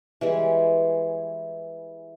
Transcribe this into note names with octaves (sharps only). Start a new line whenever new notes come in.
E3 G3 G#3